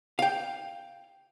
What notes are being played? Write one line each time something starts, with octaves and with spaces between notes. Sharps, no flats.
F5 G5